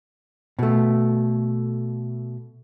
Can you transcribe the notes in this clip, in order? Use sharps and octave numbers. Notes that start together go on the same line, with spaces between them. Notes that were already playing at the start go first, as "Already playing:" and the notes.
B2 A3